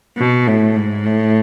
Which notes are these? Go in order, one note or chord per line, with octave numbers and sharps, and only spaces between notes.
B2
A2
G#2
A2